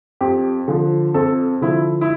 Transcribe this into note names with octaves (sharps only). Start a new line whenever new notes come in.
F2 G4
D3 F3
F2 A4
D3 F3 E4
E4